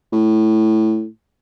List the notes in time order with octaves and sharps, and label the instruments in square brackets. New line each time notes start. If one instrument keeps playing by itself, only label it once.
[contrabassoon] A2